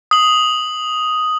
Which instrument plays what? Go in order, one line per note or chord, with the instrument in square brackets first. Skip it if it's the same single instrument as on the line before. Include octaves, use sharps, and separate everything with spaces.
[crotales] D#6 F#7